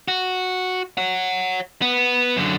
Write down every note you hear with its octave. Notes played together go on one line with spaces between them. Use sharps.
F#4
C#5 F#5
B3
F#2 D3